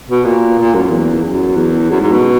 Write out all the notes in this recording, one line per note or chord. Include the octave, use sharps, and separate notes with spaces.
B2
A#2
A#2
F#2
E2
F#2
E2
F#2
G#2
B2